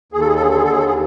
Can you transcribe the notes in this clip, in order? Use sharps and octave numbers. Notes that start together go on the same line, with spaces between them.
D#2 G#4
A4
G#4
A4
D3 G#4
A4
G#4
A4
D#2 G#4
A4
G#4